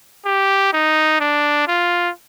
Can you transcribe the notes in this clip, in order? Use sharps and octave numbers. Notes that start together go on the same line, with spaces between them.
G4
D#4
D4
F4